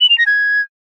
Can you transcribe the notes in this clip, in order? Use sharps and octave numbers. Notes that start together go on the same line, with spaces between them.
F#7
F7
A#6
G#6